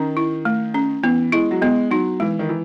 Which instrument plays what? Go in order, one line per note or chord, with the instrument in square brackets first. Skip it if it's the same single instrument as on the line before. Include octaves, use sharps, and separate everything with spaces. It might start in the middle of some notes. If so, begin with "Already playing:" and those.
Already playing: [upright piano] D#3 [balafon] C#4
[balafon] E4
A3
C#4
[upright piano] E3 [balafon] B3
[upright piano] G#3 [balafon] E4
[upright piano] F#3
[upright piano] G#3 [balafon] B3
[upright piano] F#3 [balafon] D#4
[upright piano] E3 [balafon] G#3
[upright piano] D#3
E3